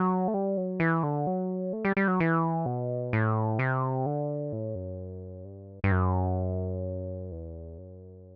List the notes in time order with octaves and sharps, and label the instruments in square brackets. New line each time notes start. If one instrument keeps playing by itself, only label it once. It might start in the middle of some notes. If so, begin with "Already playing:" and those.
Already playing: [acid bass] F#3
A3
G3
F#3
E3
D3
F#3
A3
G3
G3
F#3
E3
B2
A2
C3
D3
A2
F#2
G2
G2
F#2
E2
F#2